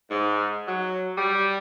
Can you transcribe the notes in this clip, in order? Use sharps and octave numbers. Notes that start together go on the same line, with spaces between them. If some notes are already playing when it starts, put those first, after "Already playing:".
G#2
F#3
G3